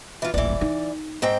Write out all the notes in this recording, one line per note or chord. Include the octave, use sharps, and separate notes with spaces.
E3 F4
D#1 A1 E3 D5
D#4
G#2 C4 G5